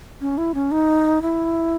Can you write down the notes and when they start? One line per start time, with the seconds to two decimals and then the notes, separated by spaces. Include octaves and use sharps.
0.21 C#4
0.38 E4
0.54 C#4
0.71 D#4
1.22 E4